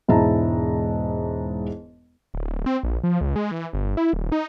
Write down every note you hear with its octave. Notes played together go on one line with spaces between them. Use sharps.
E1 G#2 G#3 E4 A5 A#5
D1
C4
A#1
F3
C#2
G#3
E3
G1
E4
D#1
D#4